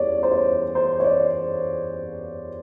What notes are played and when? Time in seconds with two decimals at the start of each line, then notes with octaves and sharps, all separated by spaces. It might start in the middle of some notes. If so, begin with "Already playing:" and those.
Already playing: E2 G3 C#5 D5
0.23 C5
0.31 C#5
0.75 C5
1.00 C#5
1.04 D5